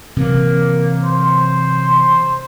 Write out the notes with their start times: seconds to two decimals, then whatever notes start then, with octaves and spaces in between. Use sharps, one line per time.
0.17 C3 E3 F#3 A#3
1.05 C5